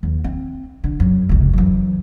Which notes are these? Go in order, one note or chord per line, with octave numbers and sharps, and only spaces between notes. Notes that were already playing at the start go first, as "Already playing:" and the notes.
D#2
C4
D3
F#2
F1 C#2
F#2 E3